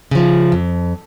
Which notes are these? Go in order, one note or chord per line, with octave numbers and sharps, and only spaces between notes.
C#3 F3
F2